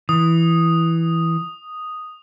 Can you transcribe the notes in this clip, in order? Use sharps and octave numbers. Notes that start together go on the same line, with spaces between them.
E3 D#6